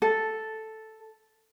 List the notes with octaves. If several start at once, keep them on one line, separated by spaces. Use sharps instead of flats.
A4